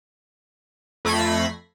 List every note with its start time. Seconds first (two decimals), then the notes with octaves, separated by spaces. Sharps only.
1.05 F2 A3 B5 G#6 A#6 C7